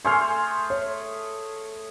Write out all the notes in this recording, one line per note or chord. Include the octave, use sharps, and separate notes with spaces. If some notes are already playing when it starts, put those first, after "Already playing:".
A3 G#4 C5 G#5 C6 F6
C#5